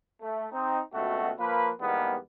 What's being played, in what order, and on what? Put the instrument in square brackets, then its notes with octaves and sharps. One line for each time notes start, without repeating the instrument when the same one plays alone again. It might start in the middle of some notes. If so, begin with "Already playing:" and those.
[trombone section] A3
C4 D#4
C#2 B2 A3 B3 C4 F#4
F3 A#3 B4
E2 G#2 G3 A#3 B3